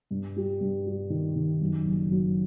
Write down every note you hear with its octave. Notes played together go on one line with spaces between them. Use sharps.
G2
G3
G2
G3
D#3
D#3
F#2
F#1
F#3